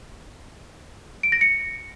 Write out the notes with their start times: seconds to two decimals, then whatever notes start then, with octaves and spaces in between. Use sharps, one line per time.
1.23 D7
1.32 A#6
1.41 C#7